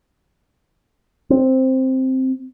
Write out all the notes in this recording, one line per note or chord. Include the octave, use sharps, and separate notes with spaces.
C4